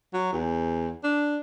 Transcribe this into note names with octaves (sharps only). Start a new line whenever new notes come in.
F#3
E2
D4